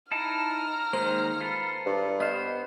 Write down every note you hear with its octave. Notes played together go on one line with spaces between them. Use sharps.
D#4 E4 A5 A#5 F6
D#3 G#3 A#3 C5
F4 A4 B4
G2
B3 C5 D#5 F6